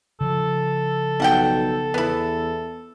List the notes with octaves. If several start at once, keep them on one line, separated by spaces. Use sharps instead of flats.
C#3 F3 A4
B1 G3 F#5 G5
E2 B3 E4